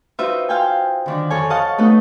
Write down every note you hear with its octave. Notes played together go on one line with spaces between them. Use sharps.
D#4 F4 F#4 B4 C5 E5
C5 F5 G5 G#5
D3 D#3 D4
F2 F3 A4 C#5 G#5
D#5 F5 F#5 A5 C#6
A3 B3 D#4 A4 F#5